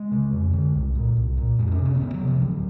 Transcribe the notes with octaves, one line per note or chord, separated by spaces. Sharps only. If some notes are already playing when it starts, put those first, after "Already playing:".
Already playing: G#3
C#3
F2
D3
C2
A#2
C2
A#2
F2 G#3
D4
C#4
C3
C#4
A#3
D2 B3
F#3
C3
F3
D2 F#3